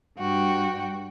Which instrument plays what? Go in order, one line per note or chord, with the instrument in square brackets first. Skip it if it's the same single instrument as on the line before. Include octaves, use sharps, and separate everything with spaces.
[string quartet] G2 F#4 G5